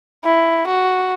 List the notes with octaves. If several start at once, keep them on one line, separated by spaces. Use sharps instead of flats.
E4
F#4